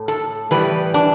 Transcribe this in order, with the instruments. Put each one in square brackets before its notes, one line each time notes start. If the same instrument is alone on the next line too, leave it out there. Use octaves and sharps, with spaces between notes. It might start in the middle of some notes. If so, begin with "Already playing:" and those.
Already playing: [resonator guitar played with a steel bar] A2
A4
A2 E3 G3 B4
D4